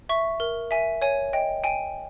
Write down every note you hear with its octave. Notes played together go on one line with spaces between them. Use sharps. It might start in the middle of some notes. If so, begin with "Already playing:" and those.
E5 C#6
A#4
E5 G#5
C#5 G#5
D#5 G5
G5 G#5